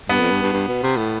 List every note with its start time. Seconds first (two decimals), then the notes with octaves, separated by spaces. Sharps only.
0.09 G2 B3
0.20 F2
0.31 G2
0.42 G2
0.53 G2
0.68 B2
0.83 C3
0.97 A2